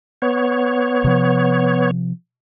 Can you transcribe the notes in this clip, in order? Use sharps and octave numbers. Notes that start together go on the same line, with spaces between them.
B3 C#5
C3 F3